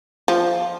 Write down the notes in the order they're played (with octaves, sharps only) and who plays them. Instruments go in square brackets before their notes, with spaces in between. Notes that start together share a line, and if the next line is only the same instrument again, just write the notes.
[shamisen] F3